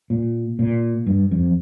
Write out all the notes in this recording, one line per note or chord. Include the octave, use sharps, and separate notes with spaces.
A#2
A#2
G2
F2